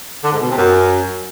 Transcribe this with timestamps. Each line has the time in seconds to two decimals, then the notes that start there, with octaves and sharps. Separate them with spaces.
0.24 D3
0.33 G#2
0.41 B2
0.50 C3
0.58 F#2